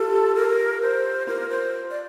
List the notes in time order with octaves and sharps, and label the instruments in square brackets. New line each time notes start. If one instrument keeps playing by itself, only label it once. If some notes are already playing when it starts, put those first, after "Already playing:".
Already playing: [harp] F4 G4 [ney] A4
[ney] A#4
C5
[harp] F4 [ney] A#4
[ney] C5
D5